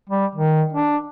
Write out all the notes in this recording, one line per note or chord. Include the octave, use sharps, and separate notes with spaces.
G3
D#3
D4